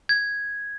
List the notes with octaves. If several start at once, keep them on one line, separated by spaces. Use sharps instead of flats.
G#6